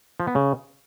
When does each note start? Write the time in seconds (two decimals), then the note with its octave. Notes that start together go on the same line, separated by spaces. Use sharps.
0.20 F3
0.27 B3
0.35 C#3